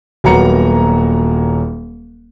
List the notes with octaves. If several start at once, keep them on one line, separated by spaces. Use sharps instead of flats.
D#1 F#3 A#3 B3 A#5 C#7